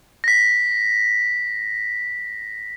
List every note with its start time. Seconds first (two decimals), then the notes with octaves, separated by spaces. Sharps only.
0.24 A#6 B6